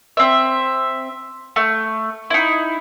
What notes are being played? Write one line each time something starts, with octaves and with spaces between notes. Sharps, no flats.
C4 E5
A3
D#4 E4